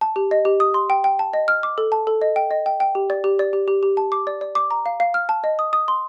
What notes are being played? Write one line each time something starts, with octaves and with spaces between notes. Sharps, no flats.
A5
G4
D#5
G4
D#6
C6
G5
G5
A5
D#5
F6
D6
A4
A5
A4
D#5
G5
D#5
G5
G5
G4
D5
G4
D5
G4
G4
G4
A5
D6
D5
D5
D6
A#5
F5
F5
F6
A5
D#5
D#6
D#6
C6